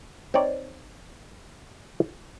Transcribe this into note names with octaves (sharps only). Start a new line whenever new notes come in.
C4 D#4 C#5 D5